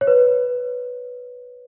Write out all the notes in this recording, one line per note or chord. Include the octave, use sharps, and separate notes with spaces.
C#5
B4